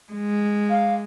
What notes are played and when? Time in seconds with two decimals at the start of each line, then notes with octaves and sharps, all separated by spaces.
0.13 G#3
0.70 F5